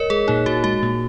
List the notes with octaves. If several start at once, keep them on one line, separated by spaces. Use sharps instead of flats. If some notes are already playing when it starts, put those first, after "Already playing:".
Already playing: A#4 C#5 D#5
G#3 G#4
A#2 D#4
A#2 F#4
G#3 F#4
A#2